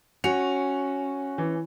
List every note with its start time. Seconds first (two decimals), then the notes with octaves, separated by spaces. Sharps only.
0.24 C#4 F#4 C#7 F7
1.38 E3